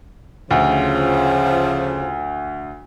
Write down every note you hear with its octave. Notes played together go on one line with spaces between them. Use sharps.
D2 C#3 F3